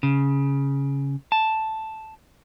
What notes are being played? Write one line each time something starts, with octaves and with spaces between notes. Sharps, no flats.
C#3
A5